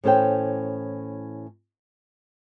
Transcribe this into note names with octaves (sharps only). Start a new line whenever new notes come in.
A2 E3 C#4 A4 C5 G5